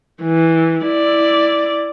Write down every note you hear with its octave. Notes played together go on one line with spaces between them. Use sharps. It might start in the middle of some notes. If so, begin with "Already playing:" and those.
E3
E4 D5